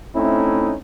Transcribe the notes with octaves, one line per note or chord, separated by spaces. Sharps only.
A3 C4 C#4 D#4 E4